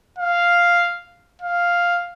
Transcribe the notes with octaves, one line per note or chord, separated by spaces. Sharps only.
F5
F5